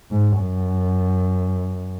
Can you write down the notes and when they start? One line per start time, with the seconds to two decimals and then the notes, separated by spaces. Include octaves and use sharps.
0.11 G#2
0.39 F#2